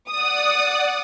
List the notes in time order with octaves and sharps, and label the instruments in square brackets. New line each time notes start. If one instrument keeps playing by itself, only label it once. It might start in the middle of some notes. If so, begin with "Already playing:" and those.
[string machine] D5 F#5 [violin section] D#6